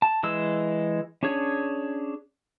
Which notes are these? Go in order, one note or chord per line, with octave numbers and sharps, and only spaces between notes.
A5
E3 G#3 E6
C#4 D4 G#4 C#5